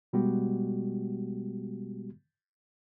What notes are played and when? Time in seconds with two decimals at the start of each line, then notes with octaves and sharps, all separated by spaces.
0.13 B2 G3 G#3 B3 F#4 G4